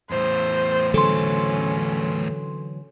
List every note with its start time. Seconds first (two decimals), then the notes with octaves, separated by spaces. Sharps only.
0.11 E2 A2 C5
0.94 D3 E3 F#3 C#4 A4 C6